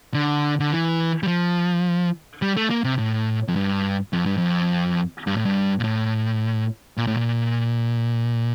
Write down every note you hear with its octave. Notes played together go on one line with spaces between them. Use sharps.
D3
D3
E3
G3
F3
G3
A3
A#3
C3
A2
F2
G2
F2
G2
F2
G2
A2
G2
A#2
A2
A#2
A2
A#2